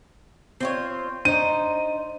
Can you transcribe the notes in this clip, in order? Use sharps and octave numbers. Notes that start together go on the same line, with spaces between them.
C4 F4 C5 C#5 C7
D4 D#4 C5 D#7